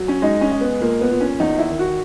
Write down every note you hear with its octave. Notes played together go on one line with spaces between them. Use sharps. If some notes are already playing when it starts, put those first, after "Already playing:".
Already playing: F#3
C#4
G#3 D#4
C#4
G#3
B3
A#2 A#3
B3
A#2
C#4
E2 D#4
E4
D#3
F#4